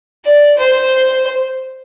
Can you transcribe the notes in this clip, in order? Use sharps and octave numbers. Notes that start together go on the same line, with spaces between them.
D5
C5